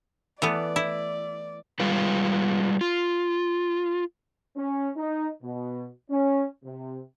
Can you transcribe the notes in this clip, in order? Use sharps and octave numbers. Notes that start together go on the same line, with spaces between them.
E3 A3 B3 D5
E4
G3 G#3 F4 B4
F4
C#4
D#4
B2
C#4
C3